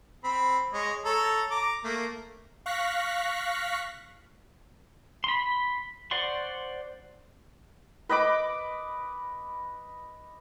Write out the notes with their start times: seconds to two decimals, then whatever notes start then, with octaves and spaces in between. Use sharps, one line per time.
0.24 C4 B5
0.73 G#3 C#5 D#5
1.05 A4 C#5 A#5
1.51 A#5 D6
1.84 A3 A#3
2.66 F5 C#6 F#6 A#6 B6
5.24 B5 C6
6.11 C5 D5 F#5 C6 C#6
8.09 B4 D#5 B5 D6